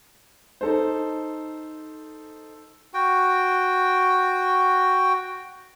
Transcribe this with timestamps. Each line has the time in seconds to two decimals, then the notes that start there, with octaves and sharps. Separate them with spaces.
0.61 D#4 A4 C5
2.94 F#4 G5